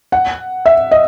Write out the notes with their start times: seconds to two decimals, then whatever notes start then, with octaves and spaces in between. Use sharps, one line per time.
0.12 F#5
0.66 E5
0.91 D#5